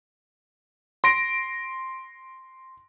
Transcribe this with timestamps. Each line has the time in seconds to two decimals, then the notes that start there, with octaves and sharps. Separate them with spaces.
1.04 C6 A#6 D7